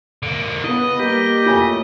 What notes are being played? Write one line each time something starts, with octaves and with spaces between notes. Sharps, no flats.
D3 A#3
C#3 B3 E4 B4 D#5
G3 A#3 G4
F2 A3 C#4 E4 F4 G#5